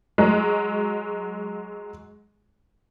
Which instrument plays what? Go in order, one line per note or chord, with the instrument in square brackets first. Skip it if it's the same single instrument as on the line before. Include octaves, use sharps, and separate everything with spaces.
[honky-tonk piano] F#3 G#3